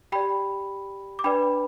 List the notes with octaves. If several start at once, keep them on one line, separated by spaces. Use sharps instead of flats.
G4 D5 G5 B5
D6
D4 B4 D5 G5 B5